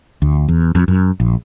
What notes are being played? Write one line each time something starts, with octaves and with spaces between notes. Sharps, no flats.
D2
E2
F2
F#2
A#1